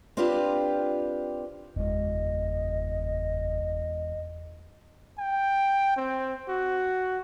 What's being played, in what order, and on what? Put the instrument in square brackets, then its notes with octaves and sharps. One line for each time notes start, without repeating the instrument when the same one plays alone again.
[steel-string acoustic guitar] C4 D4 F4 G4 B4
[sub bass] F#1 [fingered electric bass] E2 G#3 [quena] D#5
[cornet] G5
C4
F#4